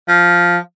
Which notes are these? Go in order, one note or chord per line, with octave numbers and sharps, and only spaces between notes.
F3